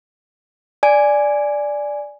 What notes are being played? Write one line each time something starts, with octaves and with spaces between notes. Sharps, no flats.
D5 G#5